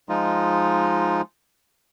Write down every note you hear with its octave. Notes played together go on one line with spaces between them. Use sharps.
F3 G#3 D#4 F4